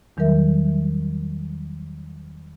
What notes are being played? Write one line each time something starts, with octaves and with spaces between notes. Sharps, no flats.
E2 D#3 F#3 G3 A#4 E5